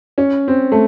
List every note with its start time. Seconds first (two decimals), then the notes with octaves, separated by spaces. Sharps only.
0.18 C#4
0.48 C4
0.72 A3